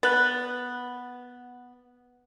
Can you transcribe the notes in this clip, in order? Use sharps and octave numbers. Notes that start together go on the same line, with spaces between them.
B3 F#6 A6